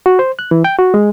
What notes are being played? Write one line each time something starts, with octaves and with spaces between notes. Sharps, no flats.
F#4
C5
F#6
E3
G5
F#4
G#3